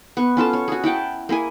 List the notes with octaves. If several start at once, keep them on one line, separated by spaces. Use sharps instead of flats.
B3 C#6
C#4 F4 A4 A5
C#5
F#4 G#4
E4 F#5 G5 A5
A#3 E4 G#4 G#5